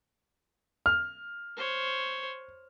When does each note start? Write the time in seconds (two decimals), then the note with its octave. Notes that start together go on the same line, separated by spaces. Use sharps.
0.86 F6
1.57 C5 C#5